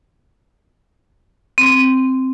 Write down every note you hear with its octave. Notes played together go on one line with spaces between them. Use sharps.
C4